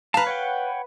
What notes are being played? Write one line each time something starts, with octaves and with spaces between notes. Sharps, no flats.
B4 F5 A5 A#5
C#5 F#5 G5